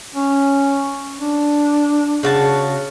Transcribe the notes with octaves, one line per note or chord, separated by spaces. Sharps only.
C#4
D4
C#3 F#4 A5